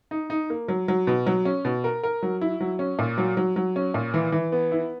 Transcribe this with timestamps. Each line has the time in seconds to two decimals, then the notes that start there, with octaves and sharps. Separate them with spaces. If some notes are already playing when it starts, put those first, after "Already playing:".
0.11 D#4
0.30 D#4
0.50 A#3
0.68 F#3
0.88 F#3
1.07 B2
1.27 F#3
1.45 C#4
1.65 B2
1.84 A#4
2.03 A#4
2.23 F#3
2.41 E4
2.60 F#3
2.79 C#4
2.99 A#2
3.18 F#3
3.37 F#3
3.56 F#3
3.76 C#4
3.94 A#2
4.14 E3
4.32 E3
4.52 B3
4.72 E4